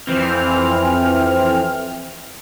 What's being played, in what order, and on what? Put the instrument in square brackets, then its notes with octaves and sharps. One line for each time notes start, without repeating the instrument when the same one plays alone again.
[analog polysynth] F2 E3 C4 F6